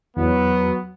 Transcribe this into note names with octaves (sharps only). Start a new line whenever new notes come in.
E2 F#3 B3